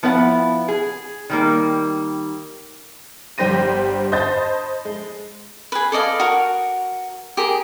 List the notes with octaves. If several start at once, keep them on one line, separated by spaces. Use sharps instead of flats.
F3 B3 E4 B4 C5 F#5
G#4
D#3 G3 A#3
G1 G3 G4 C5 A#6 D#7
C5 D#5 A5 B5 G6 A6
G#3
G#4 B4
A4 D5 D#5 F5
F#4 A#4
G4 G#4 A#4